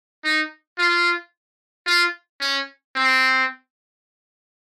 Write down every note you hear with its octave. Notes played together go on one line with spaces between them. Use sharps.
D#4
F4
F4
C#4
C4